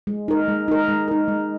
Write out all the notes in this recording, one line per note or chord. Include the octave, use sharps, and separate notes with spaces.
G#3
D#4 A#4
G#3
D#4 A#4
G#3
D#4 A#4
G#3